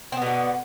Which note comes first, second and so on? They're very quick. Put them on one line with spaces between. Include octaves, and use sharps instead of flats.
C4 B3 B2 D3